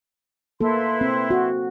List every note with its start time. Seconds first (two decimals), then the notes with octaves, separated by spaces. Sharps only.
0.61 A#3 E4 A4 B4 C6
1.01 C4
1.30 F#4